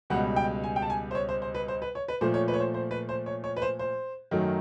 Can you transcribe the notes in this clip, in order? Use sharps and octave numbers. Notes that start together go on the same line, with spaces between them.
C#2 B2 G3 F#5
G5
G#5
G5
A5
G#5
C5
C#5
C5
C5
B4
C5
B4
C#5
B4
A#2 F3 A3 C5
C#5
B4
C#5
C5
C5
B4
C5
C#5
C#5
B4
C5
C5
F#2 D#3 F#3 A3